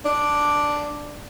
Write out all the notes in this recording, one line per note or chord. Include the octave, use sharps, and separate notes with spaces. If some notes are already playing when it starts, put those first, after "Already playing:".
D4